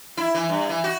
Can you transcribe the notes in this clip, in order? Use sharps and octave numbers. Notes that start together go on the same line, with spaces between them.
E4
E3
G2
E3
F#4